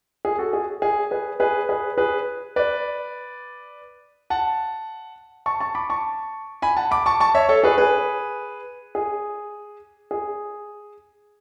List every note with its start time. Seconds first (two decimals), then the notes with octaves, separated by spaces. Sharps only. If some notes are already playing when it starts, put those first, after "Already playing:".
0.25 G#4
0.38 F#4 A4
0.53 G#4
0.82 G#4
1.11 G#4 B4
1.40 G#4 B4
1.69 G#4 B4
1.98 G#4 B4
2.56 B4 D5
4.30 F#5 A5
5.46 A5 C#6
5.60 A5 C#6
5.75 B5 D6
5.90 A5 C#6
6.62 G#5 B5
6.77 F#5 A5
6.91 B5 D6
7.06 A5 C#6
7.20 A5 C#6
7.35 C#5 E5
7.49 A4 C#5
7.63 G#4 B4
7.78 G#4 B4
8.95 G#4
10.11 G#4